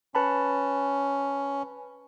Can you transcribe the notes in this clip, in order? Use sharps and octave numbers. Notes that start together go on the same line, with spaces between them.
C#4 B4 A5 B5